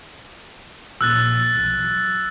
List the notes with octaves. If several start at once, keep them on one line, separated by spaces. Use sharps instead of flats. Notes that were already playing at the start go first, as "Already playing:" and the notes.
A#1 A#2 E6 F#6 A6
B1 F3
F#3